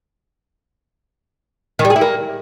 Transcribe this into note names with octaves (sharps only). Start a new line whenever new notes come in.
D#3
G3
G#4
E4
A#3